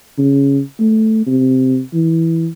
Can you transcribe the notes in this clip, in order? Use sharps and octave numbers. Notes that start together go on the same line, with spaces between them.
C#3
A3
C3
E3